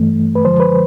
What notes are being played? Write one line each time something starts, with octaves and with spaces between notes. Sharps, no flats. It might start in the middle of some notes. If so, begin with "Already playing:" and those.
Already playing: G2 E3 A3
B4
F#2 D3 F3 G#3 C5
B4